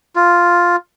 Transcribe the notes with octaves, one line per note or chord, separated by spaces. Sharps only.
F4